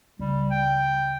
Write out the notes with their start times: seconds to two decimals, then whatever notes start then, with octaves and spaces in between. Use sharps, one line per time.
0.19 C#2 G3
0.51 G5